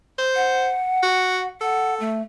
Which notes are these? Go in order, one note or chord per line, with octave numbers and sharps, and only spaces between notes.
C5
F#5
F#4
A4 F#5
A3